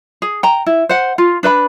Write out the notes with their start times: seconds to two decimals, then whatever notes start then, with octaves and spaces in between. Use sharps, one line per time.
0.22 G#4
0.43 G5 A#5
0.66 E4
0.89 C5 F#5
1.18 F4
1.43 D4 B4 E5 B5